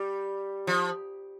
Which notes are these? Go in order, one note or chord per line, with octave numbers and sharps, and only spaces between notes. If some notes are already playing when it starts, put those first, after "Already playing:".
Already playing: G3
F3